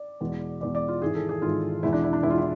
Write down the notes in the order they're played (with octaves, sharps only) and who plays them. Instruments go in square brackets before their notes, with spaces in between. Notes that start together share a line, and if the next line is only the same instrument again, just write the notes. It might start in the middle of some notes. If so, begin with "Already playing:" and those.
Already playing: [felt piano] D5
E2 B2 G#3
E2 B2 G#3 D5
D5
F4
G#1 G#2 E3 G#4
A4
G#4
G#1 G#2 E3 F4
E2 B2 G#3 E4
D4
E4
D4
E2 B2 G#3 E4
F4
E4